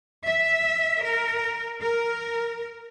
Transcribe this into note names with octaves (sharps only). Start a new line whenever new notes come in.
E5
A#4
A#4